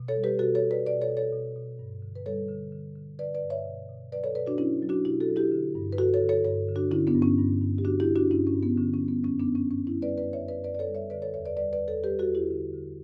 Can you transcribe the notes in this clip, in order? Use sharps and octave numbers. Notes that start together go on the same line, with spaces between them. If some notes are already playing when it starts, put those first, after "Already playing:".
Already playing: B2
A4 C#5
G3
G4 B4
B2 F#4 A4
A4 C#5
B2
B4 D5
B2 B4 D5
A4 C#5
B2
A4 C#5
B2
B2
G2
D3
B4
G3 A4 C#5
D3
D3
D3
D3 B4 D5
B4 D5
G2
C#5 E5
B2
B2
F#3 B4 D5
A4 C#5
B2 B4 D5
D4 F#4
F#3 C#4 E4
F#3
D4 F#4
B2 E4 G4
F#4 A4
F#3
E4 G4
D3
G2
B4
G2 F#4 A4
A4 C#5
D3
A4 C#5
G2 A4 C#5
D3
D4 F#4
D3 C#4 E4
B3 D4
G2
C#4
G2
G2
G4
D3 D4 F#4
E4 G4
G2
D4 F#4
G2 C#4 E4
C#4
G2
B3
D3 C#4
C#4
G3
B3
F#2 C#4
B3 D4
F#2
C#4
F#2 C#4
C#4 E4
G3
B4 D5
F#2 B4 D5
C#5 E5
F#2
B4 D5
F#2 B4 D5
D5
A4 C#5
G3
C#5 E5
D3 B4 D5
A4 C#5
E2 C#5 E5
B4 D5
G3 B4 D5
B4 D5
E2
A4 C#5
G3 G4 B4
F#4 A4
E2
E4 G4
D3
D3